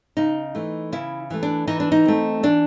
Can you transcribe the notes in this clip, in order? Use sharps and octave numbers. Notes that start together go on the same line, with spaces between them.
C#3 D#4
E3 A3
C#3 E4
E3 A3
D4
E3 D#4
D4
D#4
A3 C4
E3 D4